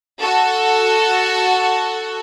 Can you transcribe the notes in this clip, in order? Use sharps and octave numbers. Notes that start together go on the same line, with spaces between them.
F#4 A4